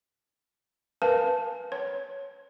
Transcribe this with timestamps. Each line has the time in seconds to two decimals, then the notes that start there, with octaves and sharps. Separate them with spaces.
1.02 A#4 B4 F5 G#5 A5
1.72 C#5